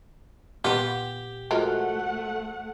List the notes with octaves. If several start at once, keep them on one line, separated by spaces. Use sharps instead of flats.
A#2 B3 F4 G4
F3 G#3 A3 F4 F#4 A#4 F#5